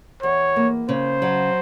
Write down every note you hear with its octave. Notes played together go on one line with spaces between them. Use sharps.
E2 C#5
A#3
C#3 C5
F#3